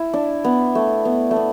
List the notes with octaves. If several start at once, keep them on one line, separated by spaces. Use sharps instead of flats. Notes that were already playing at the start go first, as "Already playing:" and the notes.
Already playing: E4
D4
B3
A3
B3
A3
B3